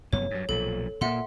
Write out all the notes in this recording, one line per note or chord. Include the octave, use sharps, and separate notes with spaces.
F1 F#2 B3 C#5
G2 F#3
B1 A#2 F3 A4
A#2 A#3 E5 F#5 C6